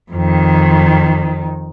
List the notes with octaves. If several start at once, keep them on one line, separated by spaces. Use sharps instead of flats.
F2 D#3